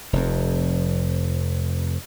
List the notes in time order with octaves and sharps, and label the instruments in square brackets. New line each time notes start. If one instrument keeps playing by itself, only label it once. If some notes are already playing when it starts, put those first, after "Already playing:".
[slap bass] F1 F2